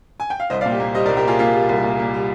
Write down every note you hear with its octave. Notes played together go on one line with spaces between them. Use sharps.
G#5
G5
F5
C2 C5 D#5
D5 F5
A#2
G4
A#3
G3 C5 D#5
A#4 D5
C2
G4 A#4
A#2 F4 G#4
A#3 F4
G3
C2
A#2
A#3
G3